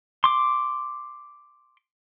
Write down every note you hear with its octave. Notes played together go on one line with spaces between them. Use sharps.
C6 D6